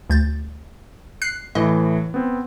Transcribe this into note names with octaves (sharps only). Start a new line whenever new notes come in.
D2 G6 A6
F#6 C7
A2 E3 D#5
B3 C4